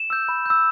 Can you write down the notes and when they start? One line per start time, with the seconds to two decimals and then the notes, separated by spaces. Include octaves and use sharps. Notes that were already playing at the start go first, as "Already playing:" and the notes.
Already playing: E7
0.10 E6 G6
0.29 B5
0.46 E6 G6